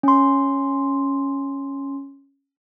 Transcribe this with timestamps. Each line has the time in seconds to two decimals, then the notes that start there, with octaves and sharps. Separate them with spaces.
0.03 C#4 C6